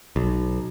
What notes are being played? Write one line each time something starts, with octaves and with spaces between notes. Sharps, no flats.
B1